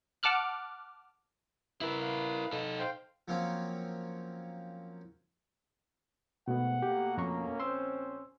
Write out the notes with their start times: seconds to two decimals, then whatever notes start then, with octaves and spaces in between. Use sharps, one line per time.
0.23 F#5 A5 D6 F6 F#6
1.81 E4 A#4 B4 E5
2.01 B4 F5
2.53 D#4 A4
2.79 C5 F5 G5
3.28 F3 F#3 A#3 C4 C#4
6.48 G#1 B2 A3 B3 F#5
6.82 B2 A3 A#3 G4
7.18 F2 C#4 A#5 C#6
7.60 A#1 C4 C5 C6 E6